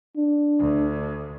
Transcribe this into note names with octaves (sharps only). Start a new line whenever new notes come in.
D4
D2